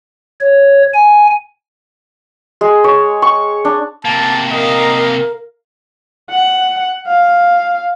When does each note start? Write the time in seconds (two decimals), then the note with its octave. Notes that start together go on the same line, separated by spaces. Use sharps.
0.41 C#5
0.94 G#5
2.61 G#3
2.84 C#5
3.22 C#6
3.65 D4
4.05 C3 A#3 A5
4.52 A#4 D#5 F5 A#5
6.30 F#5
7.08 F5